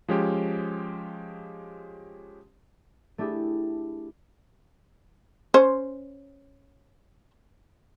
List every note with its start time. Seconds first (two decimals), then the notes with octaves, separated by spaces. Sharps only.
0.08 F3 G#3 C#4 G4
3.18 A3 D4 E4 G4 G#4
5.54 C#4 C5